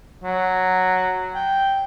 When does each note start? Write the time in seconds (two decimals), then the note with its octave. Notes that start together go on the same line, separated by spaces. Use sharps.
0.24 F#3
1.35 G5